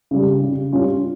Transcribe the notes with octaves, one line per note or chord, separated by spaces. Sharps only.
C#3 G3
C#3
G3 C#4 F4